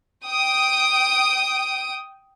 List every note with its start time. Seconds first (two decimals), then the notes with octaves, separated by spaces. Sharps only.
0.25 G5 D#6 D7